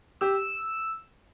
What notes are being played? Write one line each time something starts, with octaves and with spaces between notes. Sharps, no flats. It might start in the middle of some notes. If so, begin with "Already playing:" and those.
G4 E6
E6